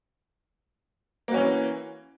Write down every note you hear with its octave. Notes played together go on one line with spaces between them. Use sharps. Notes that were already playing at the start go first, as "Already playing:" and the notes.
E3 A#3 C#4 F#4